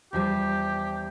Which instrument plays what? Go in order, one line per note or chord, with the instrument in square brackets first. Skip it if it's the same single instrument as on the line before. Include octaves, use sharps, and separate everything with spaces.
[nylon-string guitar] E2 F3 G3 [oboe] G4